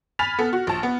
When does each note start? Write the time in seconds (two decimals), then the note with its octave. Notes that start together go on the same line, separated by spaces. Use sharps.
0.19 G#5 B5 F6 A6 B6 F7
0.39 B3 A4
0.53 F#4
0.67 A#1 A5
0.83 B3